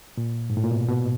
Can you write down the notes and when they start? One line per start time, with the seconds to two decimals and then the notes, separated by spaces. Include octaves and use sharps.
0.17 A#2
0.50 G#2
0.57 A2
0.64 A#2
0.71 B2
0.89 B2